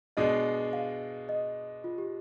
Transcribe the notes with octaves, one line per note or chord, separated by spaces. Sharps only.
B2 G#3 D4 D#5
F5
D#5
F4
G4